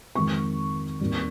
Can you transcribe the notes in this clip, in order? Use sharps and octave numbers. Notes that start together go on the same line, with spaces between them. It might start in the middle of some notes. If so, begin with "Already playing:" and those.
F2 D#3 G#3 C4 C#6
D#2 D#3 G3 C4